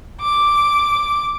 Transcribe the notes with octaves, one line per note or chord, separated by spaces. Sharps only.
D6